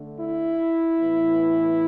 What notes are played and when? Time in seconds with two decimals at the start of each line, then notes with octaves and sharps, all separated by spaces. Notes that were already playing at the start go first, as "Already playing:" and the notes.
Already playing: D3 A3
0.20 E4
0.99 A2 E3 B3